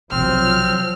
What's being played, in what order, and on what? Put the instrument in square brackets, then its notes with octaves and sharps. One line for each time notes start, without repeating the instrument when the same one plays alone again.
[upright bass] B1 C3 [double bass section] F3 F#3 [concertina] C4 C5 [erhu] F6